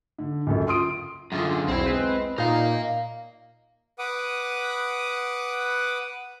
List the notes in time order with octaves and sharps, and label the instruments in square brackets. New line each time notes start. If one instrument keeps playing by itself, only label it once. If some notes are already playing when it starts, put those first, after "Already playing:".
[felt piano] D3
C#2 F#2 A4
F4 C6 D#6 D7
[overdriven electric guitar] F#2 D3 [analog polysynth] F4 G#4
[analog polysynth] B1 E2 E4 [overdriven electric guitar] C4
[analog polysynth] G#3 B4
[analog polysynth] A#2 D#4 [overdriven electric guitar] A#4 F5
[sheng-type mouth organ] B4 F#5 D6 D#6